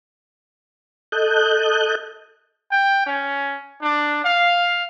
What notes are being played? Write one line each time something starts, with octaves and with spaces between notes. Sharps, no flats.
A4 D#5 F#6 G6
G5
C#4
D4
F5